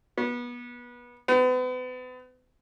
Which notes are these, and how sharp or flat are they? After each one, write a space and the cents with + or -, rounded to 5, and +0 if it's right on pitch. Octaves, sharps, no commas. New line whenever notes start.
B3 -25
B3 +40